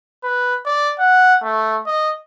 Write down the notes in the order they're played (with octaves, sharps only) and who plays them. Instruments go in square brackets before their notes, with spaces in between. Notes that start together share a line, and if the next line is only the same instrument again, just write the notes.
[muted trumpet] B4
D5
F#5
A3
D#5